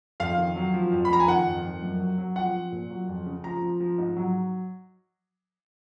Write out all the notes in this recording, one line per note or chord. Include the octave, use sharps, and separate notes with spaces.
F2 F5
D#3
F#3
F3
F2
B5
F3 A#5
G#5
D#3 F#5
F2
F2
F#2
F#3
F#3
F3 F#5
F3
A#2
F#3
F2
C#3
F3 A#5
F3
F3
G#2
F#3